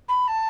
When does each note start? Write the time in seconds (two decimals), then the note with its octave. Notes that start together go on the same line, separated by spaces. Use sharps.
0.08 B5
0.28 A5